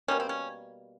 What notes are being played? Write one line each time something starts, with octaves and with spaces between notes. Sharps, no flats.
B2 G3 A#3 C#4
C4
C#4